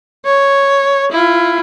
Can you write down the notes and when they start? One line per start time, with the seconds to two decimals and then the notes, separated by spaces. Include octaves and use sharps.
0.25 C#5
1.11 E4 F4